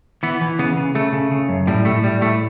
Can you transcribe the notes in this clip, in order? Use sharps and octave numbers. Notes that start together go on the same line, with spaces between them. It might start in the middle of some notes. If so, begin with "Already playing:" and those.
E3 B3
E3
C#3 B3
C#3
C#3 A3
C#3
C#3
F#2
A2 G3
A2 A3
A2 G3
A2 A3